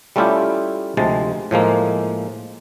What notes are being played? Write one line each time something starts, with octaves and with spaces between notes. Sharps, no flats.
G3 A3 C#4 E4 F4 G4
D2 C3 F3 G#3 A5
A2 F3 G#3 A#3